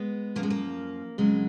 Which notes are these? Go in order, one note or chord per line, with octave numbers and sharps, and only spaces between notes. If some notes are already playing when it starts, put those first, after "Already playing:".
Already playing: G#3 B3
F#2 F3 A#3
G#3
A#3
F2 C#3 F#3 G#3